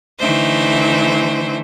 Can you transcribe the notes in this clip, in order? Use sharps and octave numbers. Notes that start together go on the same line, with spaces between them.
D3 E3 A3 D#4 C5 E5